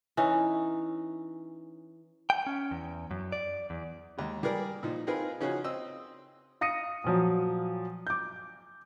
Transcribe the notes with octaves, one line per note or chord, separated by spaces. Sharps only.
E3 C#4 D#4
G5
C#4
E2
F#2
D5
E2
D#2 G#3
G3 G#4 A#4 D5
A#2 F3 D#4
C4 D#4 F4 G#4 A#4 B4
C#3 F3 C#4 D#4 F#4 G#4
C4 D#5 E6
F5 D#6 A#6 C#7 D#7
A#2 F3 F#3
D6 G6